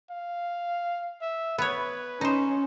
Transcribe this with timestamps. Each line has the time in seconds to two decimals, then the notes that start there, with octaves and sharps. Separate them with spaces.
0.11 F5
1.22 E5
1.58 B3 B4 C#5
2.21 C#4 D#4 C5